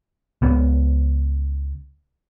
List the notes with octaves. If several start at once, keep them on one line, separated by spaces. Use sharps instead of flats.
C#2 B3